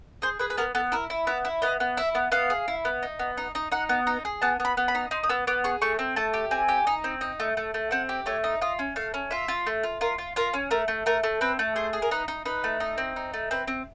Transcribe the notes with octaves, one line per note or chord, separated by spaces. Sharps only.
G#4 C5
G#4 B4
B4
B3 A#4
B3 A4
E4 A#4
E4
B3 E5
E4
B3 D#5
B3
E4 E5
B3
B3 F5
G#4
E4
B3
D#4
B3
D#4
D#4
D#4 F#5
B3
D#4 A#5
G#4
B3 A5
B3
B5
B3
B5
D#4
D#4 C6
D#6
B3 E6
B3 D6
G#4 C#6
A3 C#6
C4
A3 A5
G4
C4 G#5
G4
D#4
C4
D#4
A3
A3
A3
C4 F#5
G4
A3 C#5
D#4
F4 D#5
C#4
A3 F5
C#4
F4 E5
F4
A3
F4
F4 A#4
F4
F4 A#4
C#4
A3 A#4
A3
A3 A#4
A3
C4 B4
A3
G#4 C5
G#4
A#4
D#4 B4
D#4
D#4 B4
A3
D#4
C4
D#4
A3
C4 B4
C4